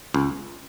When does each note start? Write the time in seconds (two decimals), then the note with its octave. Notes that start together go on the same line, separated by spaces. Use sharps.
0.14 C#2